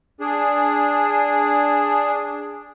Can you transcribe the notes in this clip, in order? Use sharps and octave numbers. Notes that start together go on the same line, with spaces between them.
D4 G#4